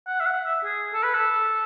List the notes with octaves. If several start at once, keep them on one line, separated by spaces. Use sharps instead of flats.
F#5
E5
F#5
E5
G#4
A4
B4
A4